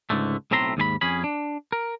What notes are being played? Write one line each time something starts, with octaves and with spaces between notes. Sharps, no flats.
C#2 G#2 D3 A3
B1 A2 C4 E5 A#5 C6
D#2 G#2 G#4 B5
F2 C#4 G#4 B5
D4
A#4